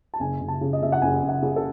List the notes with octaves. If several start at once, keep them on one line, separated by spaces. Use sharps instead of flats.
A5
F#1 G#5
F#1
A5
C#3
D#5
C#3 E5
F#5
F#1 G#5
F#1
F#5
C#3
A4